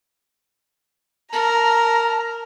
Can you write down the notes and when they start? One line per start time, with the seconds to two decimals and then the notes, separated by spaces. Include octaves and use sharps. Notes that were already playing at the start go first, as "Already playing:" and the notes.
1.32 A#4 A5 A#5